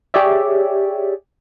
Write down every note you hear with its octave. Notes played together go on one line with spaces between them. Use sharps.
G4 G#4 C#5 D5 E5